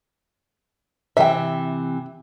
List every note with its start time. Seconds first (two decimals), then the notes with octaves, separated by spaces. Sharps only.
1.17 C3 E3 E5 G5